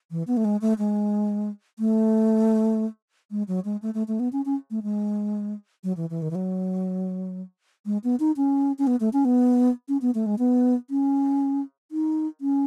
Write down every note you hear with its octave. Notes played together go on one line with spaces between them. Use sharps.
E3
B3
A3
G#3
A3
G#3
A3
G#3
F#3
G#3
A3
A3
A3
B3
C#4
C#4
A3
G#3
F#3
E3
E3
D#3
E3
F#3
G#3
B3
D#4
C#4
C#4
B3
A3
C#4
B3
C#4
B3
A3
G#3
B3
C#4
D#4
C#4